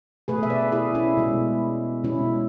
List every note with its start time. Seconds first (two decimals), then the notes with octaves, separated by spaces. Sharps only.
0.28 B2 A3 G#4 B4
0.43 E5
0.50 B4 D5
0.72 E4 G#4
0.95 C#4 E4
1.17 B2 G#3
2.04 B2 G#3 C#4 E4